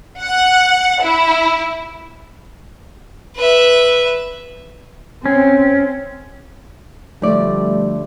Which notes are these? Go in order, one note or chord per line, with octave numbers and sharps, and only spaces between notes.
F#5
E4
B4 E5
C4 C#4
D2 F3 G3 A3 D5